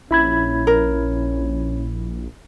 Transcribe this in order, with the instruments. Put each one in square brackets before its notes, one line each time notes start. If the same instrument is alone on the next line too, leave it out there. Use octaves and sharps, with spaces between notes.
[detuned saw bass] A#1 [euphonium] C#4 [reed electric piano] E4 B5 G#6
[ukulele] A#4